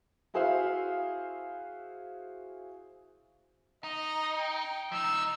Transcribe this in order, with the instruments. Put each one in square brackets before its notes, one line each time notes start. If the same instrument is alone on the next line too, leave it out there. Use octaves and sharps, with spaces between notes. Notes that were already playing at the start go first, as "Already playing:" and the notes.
[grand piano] E4 F#4 G#4 C5 E5 F5
[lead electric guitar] D#4 [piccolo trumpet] D#5
[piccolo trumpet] G5
[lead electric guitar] F3 D#4 [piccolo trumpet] E6